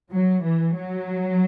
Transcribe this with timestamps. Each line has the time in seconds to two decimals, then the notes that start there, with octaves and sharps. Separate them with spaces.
0.11 F#3
0.43 E3
0.76 F#3